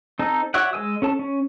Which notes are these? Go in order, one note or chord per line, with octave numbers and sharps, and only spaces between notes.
C4 D#4 A4
F#4 C#5 D5 E5 F#5
G#3 C5 G#5 E6
C#4 A4 A5
C#4